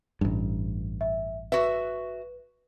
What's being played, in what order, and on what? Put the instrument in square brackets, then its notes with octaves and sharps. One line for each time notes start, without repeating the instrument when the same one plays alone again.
[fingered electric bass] A1 G2
[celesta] E5
[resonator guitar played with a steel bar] F#4 E5 [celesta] B4